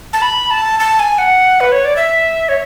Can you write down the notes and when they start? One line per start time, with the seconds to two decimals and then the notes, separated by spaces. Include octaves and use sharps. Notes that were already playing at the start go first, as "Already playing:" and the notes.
0.13 A5
0.22 B5
0.51 A5
0.80 A5
1.00 G#5
1.18 F#5
1.60 B4
1.72 C#5
1.85 D5
1.96 E5
2.49 C#5